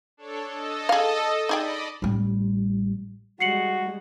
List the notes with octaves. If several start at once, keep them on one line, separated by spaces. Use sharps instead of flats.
D4 A4 C#5
A4 D#5
G#4 F5
D#4 G#4 D5 D#5 G5 B5
A1 G3
G3 G#3 F#4 C7 C#7 F#7